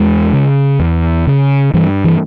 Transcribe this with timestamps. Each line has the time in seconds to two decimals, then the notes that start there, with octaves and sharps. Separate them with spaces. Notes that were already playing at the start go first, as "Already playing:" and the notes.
Already playing: E2 G#3
0.33 C#3
0.79 E2
1.27 C#3
1.74 G2 E3
2.04 E3